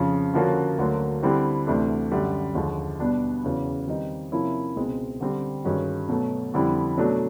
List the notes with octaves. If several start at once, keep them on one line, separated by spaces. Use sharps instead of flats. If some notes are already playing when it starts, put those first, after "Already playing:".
Already playing: F2 C#3 F3
D3 F3 A#3 C#4 F#4
D2 D3 F#3 A#3
D3 G3 C4 E4 G4
D2 C3 E3 A3 D4
F#2 D3 G3
D#2 D3 F3 G#3
B2 G3 B3 D4 G4
E2 C#3 F#3
D#3 G3 C4 D#4
C3 F3 A#3 C#4 E4
C#2 B2 G#3 C4
D3 G3 C4
G2 D#3 G#3 C#4 F#4
B2 F#3 A3
F2 D3 G3 C4 E4
B2 F#3 A3 D4